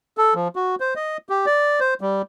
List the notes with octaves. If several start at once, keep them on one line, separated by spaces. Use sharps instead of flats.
A4
F3
F#4
C5
D#5
G4
D5
C5
G3